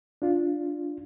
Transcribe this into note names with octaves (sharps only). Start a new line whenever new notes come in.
D4 F4